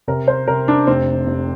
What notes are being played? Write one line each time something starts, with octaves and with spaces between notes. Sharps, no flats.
C3 A#4
C5
C3 A#4
D4
F1 C4
F1